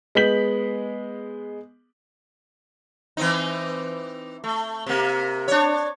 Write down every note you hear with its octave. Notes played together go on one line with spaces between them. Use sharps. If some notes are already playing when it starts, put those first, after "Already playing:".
G#3 B3 G6 B6 F#7
E3 C4 D#4
A3
C3 A#3
D4 C#5